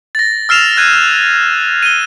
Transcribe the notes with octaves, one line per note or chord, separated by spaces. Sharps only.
A6 A#6
E6 F6 C7 E7 F7
F#6 G#6 D#7
D#7 G7